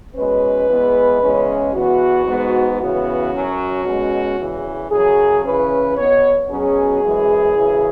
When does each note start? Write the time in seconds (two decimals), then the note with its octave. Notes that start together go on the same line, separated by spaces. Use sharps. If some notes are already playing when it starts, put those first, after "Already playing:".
0.15 B2 G#3 C#4 B4
0.68 E2 E3 G#3 B3
1.21 E2 C#3 G#3 C#4
1.74 E2 E3 B3 F#4
2.26 G#2 G#3 B3
2.79 C#3 E3 B3 F#4
3.32 F#2 F#3 C#4
3.85 B2 G#3 C#4
4.38 E2 C#3 E3
4.90 F#2 C#3 F#3 G#4
5.44 C#3 E3 C#4 B4
5.97 B2 B3 C#5
6.49 B2 F#3 C#4 G#4
7.02 F#2 E3 G#3
7.55 F#2 C#3 E3